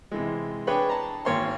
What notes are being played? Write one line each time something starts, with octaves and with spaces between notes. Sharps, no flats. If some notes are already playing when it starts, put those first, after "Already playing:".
C3 E3 G#3
D4 G#4 B4 C#5 G5 B5
A5 A#5
G#1 A#3 C#5 G5 C6